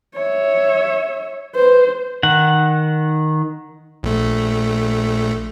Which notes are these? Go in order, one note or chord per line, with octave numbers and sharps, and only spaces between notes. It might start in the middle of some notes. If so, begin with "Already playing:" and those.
C#5 E5
B4 C5
D#3 F#5
A#1 A3